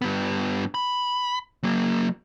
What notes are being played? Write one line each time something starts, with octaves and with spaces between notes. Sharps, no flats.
G2 B3
B5
F#3 A#3